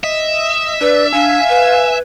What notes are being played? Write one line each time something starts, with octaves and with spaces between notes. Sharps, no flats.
D#5 E5
D4 B4 D5
D4 F5 G#5
B4